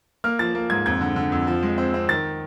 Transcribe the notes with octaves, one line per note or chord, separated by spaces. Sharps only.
A#3 F6
F3 A6
A#3
G#2 G#6
F2 G#6
D3
D3
F2
F3
G#3
C4
C4
D#3 A6